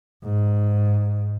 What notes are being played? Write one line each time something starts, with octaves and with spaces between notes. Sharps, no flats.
G#2